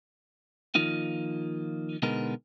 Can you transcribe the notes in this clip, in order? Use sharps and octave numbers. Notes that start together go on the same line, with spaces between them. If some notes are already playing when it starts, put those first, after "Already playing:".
D#3 F3 A#3 D#4 F4
B2 D3 G#3 B3 D#4 A#4